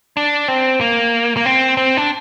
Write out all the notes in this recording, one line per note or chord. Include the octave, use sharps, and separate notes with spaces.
D4
C4
A#3
A#3
C4
C4
D4